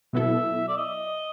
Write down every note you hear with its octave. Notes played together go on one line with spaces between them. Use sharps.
B2 F#3 B3 E4 A4 E5
D5
D#5